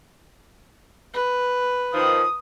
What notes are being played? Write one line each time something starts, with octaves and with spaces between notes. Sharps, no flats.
B4
D#3 F3 D#6